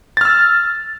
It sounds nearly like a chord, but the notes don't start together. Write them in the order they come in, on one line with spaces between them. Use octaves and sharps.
A6 F6 E6